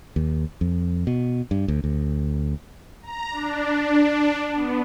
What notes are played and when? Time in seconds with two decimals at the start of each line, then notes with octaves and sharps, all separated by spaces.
0.16 D#2
0.61 F2
1.07 B2
1.51 G2
1.68 D2
1.84 D2
3.02 A#5
3.31 D4
4.54 B3